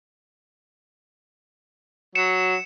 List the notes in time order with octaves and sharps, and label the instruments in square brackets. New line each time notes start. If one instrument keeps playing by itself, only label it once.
[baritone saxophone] F#3 [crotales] C#7 E7